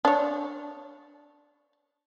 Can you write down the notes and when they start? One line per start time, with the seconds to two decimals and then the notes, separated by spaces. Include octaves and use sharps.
0.05 D4 C#5